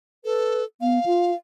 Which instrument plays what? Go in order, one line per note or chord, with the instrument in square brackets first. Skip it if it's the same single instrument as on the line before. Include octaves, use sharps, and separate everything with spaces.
[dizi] A4 [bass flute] B4
[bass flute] B3 [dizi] F5
[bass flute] F4